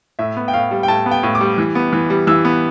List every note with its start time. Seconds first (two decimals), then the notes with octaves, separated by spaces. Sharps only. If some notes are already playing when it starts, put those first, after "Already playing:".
0.19 A2 E5
0.37 B3
0.48 G5
0.53 A2 F5
0.71 G3
0.83 G5
0.88 A2 A5
1.06 B3
1.11 G5
1.23 A2
1.35 D6
1.41 G3
1.58 E3
1.75 B3
1.92 E3
2.10 G3
2.27 E3 E6
2.45 B3